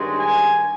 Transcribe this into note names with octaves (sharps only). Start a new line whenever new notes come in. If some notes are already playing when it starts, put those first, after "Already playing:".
Already playing: G2 D#3 G#3 C#4
G#5